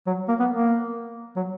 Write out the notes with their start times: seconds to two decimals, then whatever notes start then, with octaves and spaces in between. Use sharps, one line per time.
0.07 F#3
0.29 A#3
0.40 B3
0.51 A#3
1.36 F#3